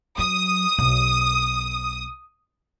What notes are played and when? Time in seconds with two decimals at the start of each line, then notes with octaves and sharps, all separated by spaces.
0.18 F#3 D#6
0.79 B1